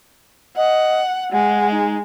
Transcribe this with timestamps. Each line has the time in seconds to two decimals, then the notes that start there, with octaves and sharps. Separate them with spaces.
0.57 D#5 F#5
1.32 G#3 F#5
1.72 D#4